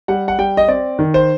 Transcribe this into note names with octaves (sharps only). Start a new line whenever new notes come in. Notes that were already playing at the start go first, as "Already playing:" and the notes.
G3 F#5
F#5
G3 G5
D#5
C4 D5
D#3
C5